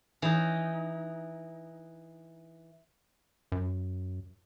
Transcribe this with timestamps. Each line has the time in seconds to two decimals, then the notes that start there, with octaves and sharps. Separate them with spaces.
0.22 E3 D#4
3.52 F#2